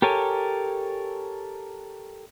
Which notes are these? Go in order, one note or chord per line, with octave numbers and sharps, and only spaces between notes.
G4 A4 A#4 C#5 G#5